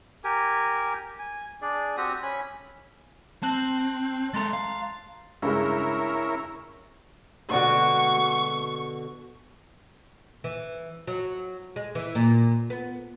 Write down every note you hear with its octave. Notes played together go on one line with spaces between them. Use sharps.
G4 A#4 G#5
G#5
D4 G#4 D5
C4 F#4 G4 D#6
C#4 G#5 B5
C4 A5 F#6 F#7
G#3 A4 A#5 C6 A6
F5
G2 C#3 G#3 C#4 E4 A#4
B2 D3 F#4 C#6
E3
F#3
G#3
E3
A#2
B3